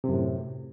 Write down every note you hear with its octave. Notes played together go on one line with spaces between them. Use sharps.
F#2 A2 C3